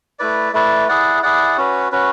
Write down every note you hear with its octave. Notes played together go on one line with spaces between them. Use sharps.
A3 E4 B4 D5
A3 E4 B4 D5
E4 G#4 D5 F#5
E4 G#4 D5 F#5
C#4 F#4 B4
C#4 F#4 B4